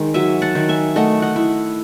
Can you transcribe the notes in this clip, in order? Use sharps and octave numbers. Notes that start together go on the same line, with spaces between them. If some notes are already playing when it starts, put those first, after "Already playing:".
Already playing: D#3 G#3
F#3 E5 G#5
F#5 A5
D#3
E5 G#5
A3 D#5 F#5
D#5 F#5
E4